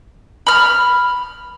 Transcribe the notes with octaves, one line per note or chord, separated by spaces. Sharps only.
B5 F6